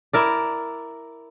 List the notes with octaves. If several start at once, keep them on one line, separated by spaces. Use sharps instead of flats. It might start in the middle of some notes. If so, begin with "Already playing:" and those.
E4 A#4 D5